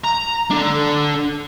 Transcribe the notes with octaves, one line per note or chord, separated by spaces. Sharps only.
A#5
D4 A4